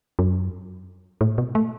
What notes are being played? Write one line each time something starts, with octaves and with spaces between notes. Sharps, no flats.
F#2
A2
B2
A3